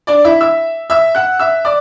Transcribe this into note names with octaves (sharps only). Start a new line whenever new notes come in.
D4 D5
E4 E5
E5 E6
E5 E6
F#5 F#6
E5 E6
D5 D6